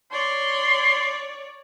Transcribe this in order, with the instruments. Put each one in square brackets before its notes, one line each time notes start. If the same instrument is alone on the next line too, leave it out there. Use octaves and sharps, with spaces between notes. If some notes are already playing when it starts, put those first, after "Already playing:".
[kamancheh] C#5 D5 [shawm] C6